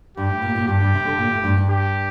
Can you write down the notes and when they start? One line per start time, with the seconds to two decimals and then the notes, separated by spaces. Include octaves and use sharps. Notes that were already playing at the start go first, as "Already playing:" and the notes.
0.17 G2 G4
0.29 A2
0.42 A#2
0.55 A#2
0.67 G2 G4
0.81 G2
0.94 C3
1.05 D3
1.18 A#2
1.31 A2
1.44 G2
1.57 G2
1.69 G4